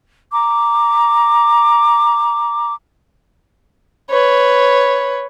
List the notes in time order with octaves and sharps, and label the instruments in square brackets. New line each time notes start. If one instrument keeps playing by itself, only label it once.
[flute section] A#5 D6
[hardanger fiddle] B4 C#5